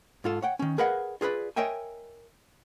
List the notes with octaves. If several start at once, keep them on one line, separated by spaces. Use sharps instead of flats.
G#2 F4 A4
C#5 F#5 G5
D#3 C#4
G#4 A#4 B4 D#5 F5 F#5
F4 G#4 A#4 B4 D5
A#4 C#5 D#5 E5 G5 G#5